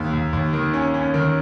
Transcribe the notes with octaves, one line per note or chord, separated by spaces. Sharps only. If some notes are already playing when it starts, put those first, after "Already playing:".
Already playing: D#2
D#2
D#2
D#3
C#4
C#4
D#3